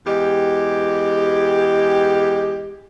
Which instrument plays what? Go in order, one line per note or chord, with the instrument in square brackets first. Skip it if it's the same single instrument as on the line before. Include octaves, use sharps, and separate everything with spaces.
[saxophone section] E2 G#3 G4